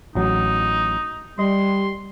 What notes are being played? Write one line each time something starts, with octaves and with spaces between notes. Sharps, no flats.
A1 F#3 D#4
G3 D#5 C6